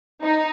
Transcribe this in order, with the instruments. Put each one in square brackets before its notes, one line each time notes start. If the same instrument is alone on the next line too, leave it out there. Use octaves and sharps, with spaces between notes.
[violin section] D#4